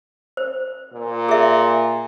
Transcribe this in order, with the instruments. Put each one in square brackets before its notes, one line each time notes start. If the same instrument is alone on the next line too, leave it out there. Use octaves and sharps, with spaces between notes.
[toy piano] C5
[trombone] A#2
[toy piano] G#4 E5